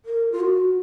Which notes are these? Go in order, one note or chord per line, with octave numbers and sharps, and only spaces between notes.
A#4
F4
F#4